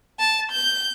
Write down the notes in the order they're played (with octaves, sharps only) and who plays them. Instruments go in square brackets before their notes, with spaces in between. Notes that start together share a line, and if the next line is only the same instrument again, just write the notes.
[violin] A5
G6